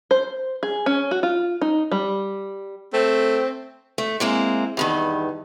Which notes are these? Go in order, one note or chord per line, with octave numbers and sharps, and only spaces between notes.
C5
G#4
C#4
F#4
F4
D#4
G3
A3 C4
A3
G#3 A#3 C4 E4
E2 G2 D#3